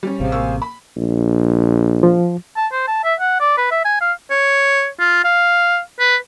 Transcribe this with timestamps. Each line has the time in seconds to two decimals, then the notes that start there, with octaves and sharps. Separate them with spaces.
0.03 G3 C#4
0.20 A1 C3 G#4 C5 F5
0.32 A#3 C#6 E6
0.62 B5
0.96 A#1
2.03 F3
2.56 A5
2.72 C5
2.88 A5
3.04 E5
3.20 F#5
3.40 D5
3.58 B4
3.71 E5
3.85 G#5
4.01 F5
4.30 C#5
4.99 F4
5.24 F5
5.99 B4